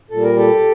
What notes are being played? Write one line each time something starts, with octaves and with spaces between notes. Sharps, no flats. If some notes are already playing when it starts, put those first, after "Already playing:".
A#2 G3 A4
A#4
G4 A4